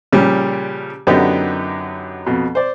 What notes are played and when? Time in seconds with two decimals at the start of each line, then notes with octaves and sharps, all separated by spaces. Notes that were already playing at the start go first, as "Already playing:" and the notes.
0.12 A#2 C#3 F3 G3 C#4
1.07 F#2 D3 B3 D#4 G4 D5
2.26 F2 B2
2.55 C5 D5